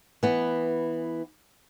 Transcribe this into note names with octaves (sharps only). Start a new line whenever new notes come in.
E3 B3